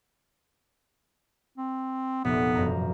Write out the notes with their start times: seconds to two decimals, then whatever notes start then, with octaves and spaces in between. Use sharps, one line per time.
1.58 C4
2.24 F1 A#2 B3 A#4
2.55 E1 F#2 A#5